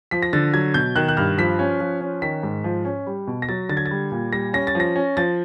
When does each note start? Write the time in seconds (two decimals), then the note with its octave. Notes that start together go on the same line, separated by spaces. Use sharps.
0.11 F3 B6
0.22 A#6
0.33 D3 A6
0.53 F#3 G#6
0.74 B2 G6
0.96 D#3 F#6
1.08 F#6
1.17 G2 F6
1.38 F3 B6
1.59 C#4
1.80 F3
2.01 C#4
2.22 D#3 B6
2.43 G#2
2.64 F3
2.85 C#4
3.07 G3
3.27 B2
3.42 A#6
3.49 F#3 A6
3.69 D3 A6
3.77 G#6
3.86 A6
3.91 G3
4.12 A#2
4.33 G3 A#6
4.53 C#4 A#6
4.67 A6
4.75 F3 A#6
4.96 C#4
5.17 F3 A6